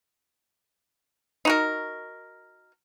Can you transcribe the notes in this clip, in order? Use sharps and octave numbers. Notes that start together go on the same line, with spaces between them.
D#4 F#4 A#4